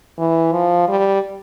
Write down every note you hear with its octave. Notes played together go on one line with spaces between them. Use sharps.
E3
F3
G3